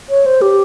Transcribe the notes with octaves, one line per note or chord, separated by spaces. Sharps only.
C#5
C5
G4